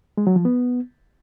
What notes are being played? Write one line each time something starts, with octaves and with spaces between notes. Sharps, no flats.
G#3
F#3
F3
B3